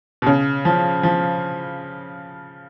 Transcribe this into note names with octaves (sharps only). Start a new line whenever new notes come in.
B2
C#3
F3
F3